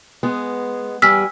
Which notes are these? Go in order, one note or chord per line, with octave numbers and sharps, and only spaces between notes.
G#3 B3
E2 G3 G#5 E6 F6 B6